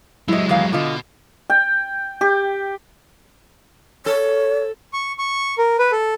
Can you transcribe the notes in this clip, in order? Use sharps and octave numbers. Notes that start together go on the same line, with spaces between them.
F#3 G#3 E4 D#5
E2 D#3 F5
B2 D3 F4 D#5
G5
G4
A4 C#5
C#6
C#6
A#4
B4
A4